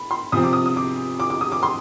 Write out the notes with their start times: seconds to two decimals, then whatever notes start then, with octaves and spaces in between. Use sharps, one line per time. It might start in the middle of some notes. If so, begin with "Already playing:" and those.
Already playing: B5
0.11 C6
0.32 C3 F3 C4 D#6
0.43 D6
0.53 D#6
0.66 D#6
0.76 D6
1.20 D6
1.30 D6
1.41 D#6
1.52 D6
1.63 C6